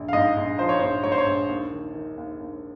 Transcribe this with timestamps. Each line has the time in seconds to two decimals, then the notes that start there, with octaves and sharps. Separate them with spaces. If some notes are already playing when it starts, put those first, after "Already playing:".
Already playing: A#1
0.08 F5
0.13 G#2 D#5
0.36 A#1
0.58 F3 C5
0.69 C#5
0.79 A#1 C5
1.04 G#2 C#5
1.12 C5
1.18 C#5
1.26 A#1
1.49 D#2
1.73 D#3
1.95 D#3
2.18 D#2
2.40 D#2